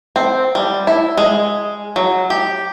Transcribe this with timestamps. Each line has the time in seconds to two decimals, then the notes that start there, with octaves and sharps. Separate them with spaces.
0.16 C4
0.55 G3
0.87 E4
1.17 G#3
1.96 F#3
2.30 G4